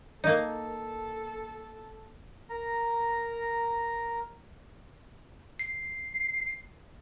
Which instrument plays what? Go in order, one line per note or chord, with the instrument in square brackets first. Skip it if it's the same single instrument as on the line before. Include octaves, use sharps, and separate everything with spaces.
[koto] A#3 D#4 [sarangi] A4
[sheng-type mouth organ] A#4 A#5
[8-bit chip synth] C7